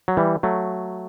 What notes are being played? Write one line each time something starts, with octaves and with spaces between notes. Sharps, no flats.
F#3
E3 G3
F#3 A3